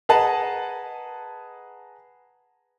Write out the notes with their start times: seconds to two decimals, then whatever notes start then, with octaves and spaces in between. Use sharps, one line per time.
0.09 G#4 B4 D#5 F#5 A5 A#5